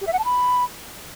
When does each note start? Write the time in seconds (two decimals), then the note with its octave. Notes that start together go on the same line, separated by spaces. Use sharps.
0.01 G4
0.07 E5
0.13 F#5
0.19 A5
0.25 B5